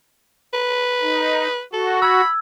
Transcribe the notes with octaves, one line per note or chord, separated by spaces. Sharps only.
B4
D#4
F#4 A4
B5 E6 G#6